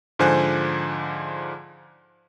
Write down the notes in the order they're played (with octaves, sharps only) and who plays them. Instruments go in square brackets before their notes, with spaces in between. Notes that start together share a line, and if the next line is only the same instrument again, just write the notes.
[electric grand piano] G#2 D3 F3 C5 G#5 F#6